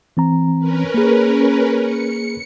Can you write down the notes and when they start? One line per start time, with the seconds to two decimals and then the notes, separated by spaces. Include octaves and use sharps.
0.17 E3 C4 A#5
0.59 C#4 A#4 B4
0.94 A#3 G#4
1.83 C#7